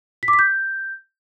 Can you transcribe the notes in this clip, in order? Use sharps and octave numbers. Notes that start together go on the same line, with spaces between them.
B6
D6
B6
G6